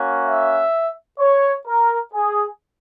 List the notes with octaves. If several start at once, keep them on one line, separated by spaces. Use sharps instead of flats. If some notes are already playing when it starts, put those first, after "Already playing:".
Already playing: A#3 C#4 F#4
E5
C#5
A#4
G#4